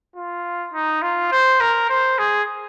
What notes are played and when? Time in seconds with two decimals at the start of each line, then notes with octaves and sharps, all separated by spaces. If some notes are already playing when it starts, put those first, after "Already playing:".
0.16 F4
0.73 D#4
1.02 F4
1.32 C5
1.60 A#4
1.90 C5
2.19 G#4